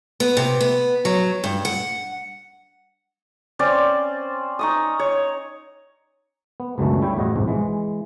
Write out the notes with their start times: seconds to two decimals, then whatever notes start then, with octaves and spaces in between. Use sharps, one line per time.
0.20 B3
0.37 C3
0.61 B3
1.05 F#3
1.44 G2
1.65 F#5
3.59 C4 C#4 C5 D5
4.59 D#4 C#6 D#6
4.99 C#5
6.60 B3
6.78 C#2 F#2 B2 D3 E3 A3
7.02 G3 E4 C#5 E5 G5
7.16 E2 A2 F#4 D#5
7.36 C2 F2 G#2
7.48 E3 G#3